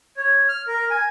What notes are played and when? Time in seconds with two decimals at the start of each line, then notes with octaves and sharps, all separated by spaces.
0.17 C#5
0.49 F6
0.67 A#4
0.91 G#5